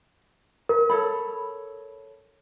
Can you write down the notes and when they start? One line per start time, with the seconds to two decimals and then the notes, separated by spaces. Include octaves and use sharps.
0.69 A#4
0.90 A4 C#5 B5